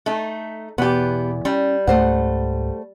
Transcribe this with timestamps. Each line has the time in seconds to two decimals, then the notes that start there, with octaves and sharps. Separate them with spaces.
0.06 A3 D#4
0.78 E2 B2 B3 G4
1.45 G3 C#4
1.87 C#2 G#2 A3 C5 F#5